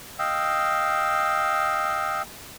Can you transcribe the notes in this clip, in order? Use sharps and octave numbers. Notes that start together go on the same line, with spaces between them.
D#5 F5 G5 E6